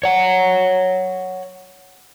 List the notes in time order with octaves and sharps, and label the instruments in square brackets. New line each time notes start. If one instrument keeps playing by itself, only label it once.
[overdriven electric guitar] C#5 F#5